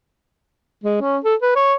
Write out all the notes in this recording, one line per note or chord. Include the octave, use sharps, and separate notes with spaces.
G#3
C#4
A4
B4
C#5